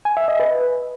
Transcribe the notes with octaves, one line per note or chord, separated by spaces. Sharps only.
G#5
E5
D#5
B4